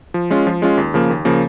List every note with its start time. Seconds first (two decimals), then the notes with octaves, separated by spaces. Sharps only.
0.14 F3
0.30 G#3 C#4 F4
0.47 F3
0.62 G#3 C#4 F4
0.77 D#2
0.94 C#3 F3 A#3
1.10 D#2
1.25 C#3 F3 A#3